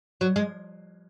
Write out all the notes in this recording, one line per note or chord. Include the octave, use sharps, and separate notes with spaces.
F#3
G#3